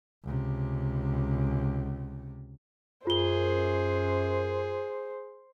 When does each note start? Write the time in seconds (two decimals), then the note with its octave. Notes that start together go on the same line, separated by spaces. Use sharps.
0.24 C#2 C3
3.07 F#2 F4 G#4 C5 G7